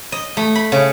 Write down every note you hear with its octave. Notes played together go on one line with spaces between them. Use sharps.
D#5
A3
B5
C#3